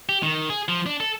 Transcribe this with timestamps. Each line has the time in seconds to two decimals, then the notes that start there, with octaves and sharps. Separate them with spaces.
0.09 G4
0.23 D#3
0.50 G#4
0.68 F3
0.86 D4
1.00 A4